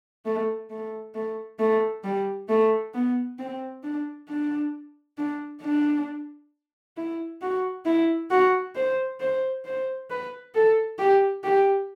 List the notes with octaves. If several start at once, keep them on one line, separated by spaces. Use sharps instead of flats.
A3
A3
A3
A3
G3
A3
B3
C4
D4
D4
D4
D4
E4
F#4
E4
F#4
C5
C5
C5
B4
A4
G4
G4